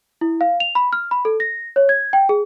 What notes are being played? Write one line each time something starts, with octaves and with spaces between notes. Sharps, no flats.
E4
F5
F7
B5
F6
B5
A4
A#6
C#5
G#6
G5
G#4